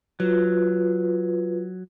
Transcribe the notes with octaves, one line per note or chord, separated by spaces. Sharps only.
F#3 F4 B4